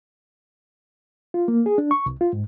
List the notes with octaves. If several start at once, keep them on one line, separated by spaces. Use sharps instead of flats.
F4
A#3
G#4
D4
C#6
C2
F4
G#2